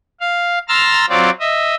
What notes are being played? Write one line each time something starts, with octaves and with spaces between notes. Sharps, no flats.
F5
A#5 C6 E6 F6 A6
F#3 C4 F4 D5
D#5 E5